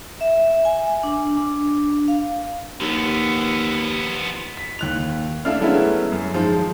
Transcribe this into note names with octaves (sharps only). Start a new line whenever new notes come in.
E5
G#5
D4
D4
F5
D#2 F3 B3
B6
D#2 F#6 F7
A3 D4 E4 F5 F6
F#3 G#3 A3 B3 C#4 E4
F#2
G#2 D#3 F3 G#3